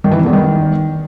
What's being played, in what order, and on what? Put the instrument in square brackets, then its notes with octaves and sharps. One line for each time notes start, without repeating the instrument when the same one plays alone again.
[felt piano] D#3
E3
C3
E2
D#3